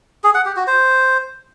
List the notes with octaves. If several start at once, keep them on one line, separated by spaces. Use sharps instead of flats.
G#4
F#5
G4
F#4
C5